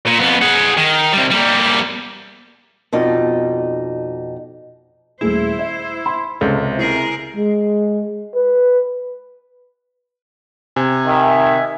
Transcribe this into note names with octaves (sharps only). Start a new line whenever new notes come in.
A#2
F2 B3
G#4 F#5
D#3
C3 G3
G3 A#3
F2 B2 D#4 D5
D#1 A3 E4 G#4 C5
E5
B5 C6
C#2 C3 A4
E4 G#4 A#4
G#3
B4
C3 G#5
D#3 E5